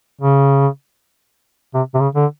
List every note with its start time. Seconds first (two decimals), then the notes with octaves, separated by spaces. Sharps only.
0.21 C#3
1.74 C3
1.94 C3
2.00 C#3
2.15 D3